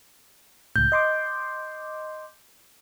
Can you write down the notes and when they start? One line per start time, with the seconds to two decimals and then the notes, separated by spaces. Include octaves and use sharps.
0.76 C#2 A2 G6
0.92 D#5 C6 D6